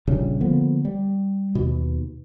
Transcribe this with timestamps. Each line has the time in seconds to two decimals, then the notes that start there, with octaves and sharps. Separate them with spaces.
0.07 A#1 F2 C#3 G3
0.41 D3 F3 A#3 B3
0.85 G3
1.55 D#2 B2